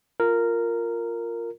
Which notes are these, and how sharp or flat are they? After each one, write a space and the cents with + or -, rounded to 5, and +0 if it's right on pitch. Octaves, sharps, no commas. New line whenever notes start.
F4 +0 A#4 -10